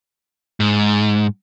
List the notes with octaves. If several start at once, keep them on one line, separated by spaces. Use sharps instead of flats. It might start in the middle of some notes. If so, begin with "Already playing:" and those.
G#2